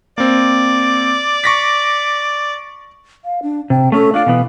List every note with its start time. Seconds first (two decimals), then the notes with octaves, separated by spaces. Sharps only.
0.18 A#3 C4 D5
1.44 C#6 A#6 B6
3.25 F5
3.43 D4
3.70 C3 G5
3.92 A3 C#4 A4
4.14 D4 F4 D5 F5
4.26 B2 E3 B3